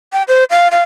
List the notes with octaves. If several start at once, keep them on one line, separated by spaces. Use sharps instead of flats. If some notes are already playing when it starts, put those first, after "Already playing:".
G5
C5
F5
F5